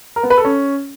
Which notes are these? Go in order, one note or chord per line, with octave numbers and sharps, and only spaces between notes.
A#4
B3
B4
A4
C#4